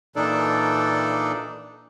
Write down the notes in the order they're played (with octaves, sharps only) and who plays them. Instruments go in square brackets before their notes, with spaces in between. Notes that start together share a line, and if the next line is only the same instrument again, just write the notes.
[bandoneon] A#2 E3 D4 D#4 A4 D5